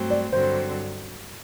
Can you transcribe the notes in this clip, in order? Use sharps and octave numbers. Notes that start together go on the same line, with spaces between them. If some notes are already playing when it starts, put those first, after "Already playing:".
Already playing: G2 F#3 A3 C4
D5
G2 D3 F#3 C4 C5